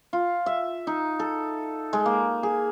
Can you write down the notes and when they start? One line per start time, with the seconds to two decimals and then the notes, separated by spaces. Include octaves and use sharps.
0.13 F4
0.46 E5
0.87 D#4
1.19 A4
1.93 G#3
2.05 A#3
2.43 G#4